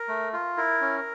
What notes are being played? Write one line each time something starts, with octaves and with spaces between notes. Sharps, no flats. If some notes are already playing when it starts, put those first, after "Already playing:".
Already playing: A#4
A3
F4
E4 A#4
C#4